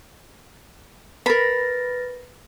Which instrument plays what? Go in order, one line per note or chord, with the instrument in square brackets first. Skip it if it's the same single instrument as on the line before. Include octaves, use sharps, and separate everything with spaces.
[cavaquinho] A#4 B5 [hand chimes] B4 A6 A#6